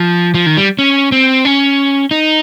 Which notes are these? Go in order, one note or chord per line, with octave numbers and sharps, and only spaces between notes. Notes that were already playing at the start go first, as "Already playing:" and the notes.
Already playing: F3
F3
D#3
G3
C#4
C4
C#4
D#4